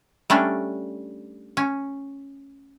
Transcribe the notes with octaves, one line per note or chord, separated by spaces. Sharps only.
G3 A3 C#4 D4
C#4